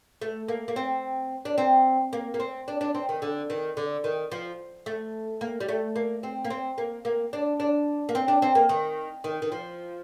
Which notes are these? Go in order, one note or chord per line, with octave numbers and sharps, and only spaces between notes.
A3
A#3
A#3
C4
D4
C4
A#3
A#3
C4
D4
D4
C4
D#3
D3
D#3
D3
D#3
F3
A3
A#3
G3
A3
A#3
C4
A#3
C4
A#3
A#3
D4
D4
A#3
C4
D4
C4
A#3
D#3
D#3
D#3
F3